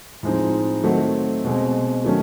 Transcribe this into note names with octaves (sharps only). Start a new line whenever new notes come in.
A2 F3 G#3 C4 D#4
D#3 F#3 A3 C4
B2 G#3 C4
D#3 F#3 A3 C#4